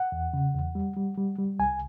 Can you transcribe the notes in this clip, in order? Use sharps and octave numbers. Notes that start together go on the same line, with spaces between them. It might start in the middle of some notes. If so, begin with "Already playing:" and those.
Already playing: F#5
E2
C#3
E2
G3
G3
G3
G3
C2 G#5